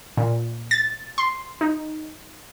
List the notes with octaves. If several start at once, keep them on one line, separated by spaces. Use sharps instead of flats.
A#2
A6
C6
D#4